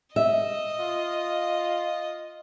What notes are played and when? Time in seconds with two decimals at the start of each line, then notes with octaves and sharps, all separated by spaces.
0.16 D#5 E5
0.80 F4